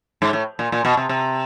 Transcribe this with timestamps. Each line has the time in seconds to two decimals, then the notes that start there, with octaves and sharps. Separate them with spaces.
0.22 G#2
0.33 A2
0.59 A#2
0.72 A#2
0.85 B2
0.97 C3
1.09 C3